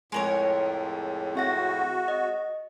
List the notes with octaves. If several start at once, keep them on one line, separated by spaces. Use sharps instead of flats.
F2 A2 G#3 A#4 C#5
C4 F#4 E5 A#6
D#5